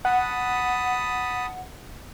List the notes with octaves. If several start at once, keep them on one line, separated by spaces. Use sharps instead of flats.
F#5 A5 B5 D#6